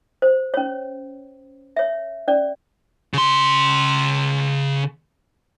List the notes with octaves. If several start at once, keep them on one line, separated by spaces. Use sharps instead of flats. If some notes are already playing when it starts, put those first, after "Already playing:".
C5
C#4 C#5
C#5 E5
C#4 D5
C#3 C6